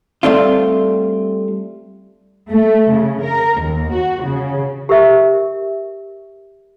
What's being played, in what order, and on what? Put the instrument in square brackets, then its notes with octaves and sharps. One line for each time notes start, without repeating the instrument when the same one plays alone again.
[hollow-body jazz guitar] G3 A3 C4 D4 F4
[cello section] A3
C#3
A#4
D#2
F#4
C#3
[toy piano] G4 A#4 E5